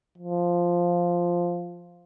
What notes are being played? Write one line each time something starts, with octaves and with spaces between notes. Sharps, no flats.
F3